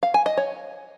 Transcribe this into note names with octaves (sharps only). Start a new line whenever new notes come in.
F5
G#5
D#5
C#5